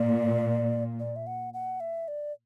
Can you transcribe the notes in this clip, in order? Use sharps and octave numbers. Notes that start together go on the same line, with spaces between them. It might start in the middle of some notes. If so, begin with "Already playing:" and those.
Already playing: A#2 D5
D5
E5
F#5
F#5
E5
D5